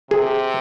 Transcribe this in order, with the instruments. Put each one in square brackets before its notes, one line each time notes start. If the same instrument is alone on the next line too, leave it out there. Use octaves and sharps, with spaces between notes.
[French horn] C3 [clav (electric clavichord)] G#4